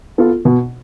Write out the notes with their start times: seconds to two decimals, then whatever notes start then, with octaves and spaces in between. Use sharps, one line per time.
0.18 B3 F4 A4
0.45 B2